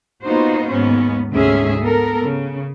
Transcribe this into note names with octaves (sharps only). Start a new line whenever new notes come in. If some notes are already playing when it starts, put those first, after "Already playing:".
A#3 B3 D#4 F4 F#4 C5
D#2 G#2 B3 C#4
D2 G#2 C3 C#4 G#4 E5
B3 A4 A#4
C#3